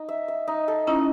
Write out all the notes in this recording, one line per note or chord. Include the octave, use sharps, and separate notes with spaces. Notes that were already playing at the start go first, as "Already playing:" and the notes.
Already playing: D#4
E5
E5
D#4
A4
C#4 D#4 E4